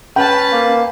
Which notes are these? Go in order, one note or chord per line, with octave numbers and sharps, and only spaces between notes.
C#4 B4 G5 A5
A#3